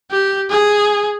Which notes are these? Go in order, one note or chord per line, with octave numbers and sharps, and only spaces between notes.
G4
G#4